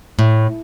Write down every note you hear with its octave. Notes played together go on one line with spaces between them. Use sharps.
A2